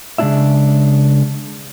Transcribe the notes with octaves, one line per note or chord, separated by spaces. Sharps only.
C#3 G#3 B3 D4 E4 E5